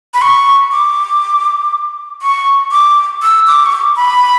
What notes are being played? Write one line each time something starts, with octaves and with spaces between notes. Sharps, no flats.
B5
C#6
D6
C#6
D6
E6
D6
C#6
D6
B5